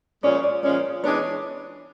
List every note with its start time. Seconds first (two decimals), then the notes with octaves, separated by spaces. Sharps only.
0.23 A#2 F3 G#3 C#4 D5
0.43 D5
0.63 A#2 F3 G#3 C#4 D5
1.03 E3 G#3 B3 D4 C#5